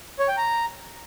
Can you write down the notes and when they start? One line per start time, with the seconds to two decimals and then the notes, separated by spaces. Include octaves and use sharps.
0.19 C#5
0.28 G5
0.37 A#5